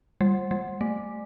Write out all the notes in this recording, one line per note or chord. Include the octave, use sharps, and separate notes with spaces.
G3
G3
A3